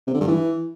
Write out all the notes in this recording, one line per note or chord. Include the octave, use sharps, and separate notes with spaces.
C3
D3
G2
E3